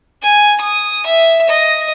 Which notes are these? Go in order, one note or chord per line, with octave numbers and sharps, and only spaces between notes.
G#5
D#6
E5
D#5